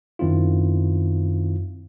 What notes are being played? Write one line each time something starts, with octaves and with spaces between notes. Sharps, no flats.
F#2 D#3 C4 E4 F4